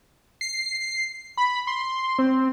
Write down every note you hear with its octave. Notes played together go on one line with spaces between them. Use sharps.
C7
B5
C6
C4